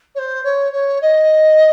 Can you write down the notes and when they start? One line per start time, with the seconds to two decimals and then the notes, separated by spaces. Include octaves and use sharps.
0.15 C#5
0.19 C5
0.44 C#5
0.73 C#5
1.02 D#5